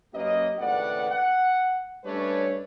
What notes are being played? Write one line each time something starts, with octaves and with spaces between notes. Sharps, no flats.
F#2 A#3 C#4 G4 B4 D#5
G#1 C#2 A2 B4 D5 F#5
F#5
G3 A3 C#4 D4 B4 C#5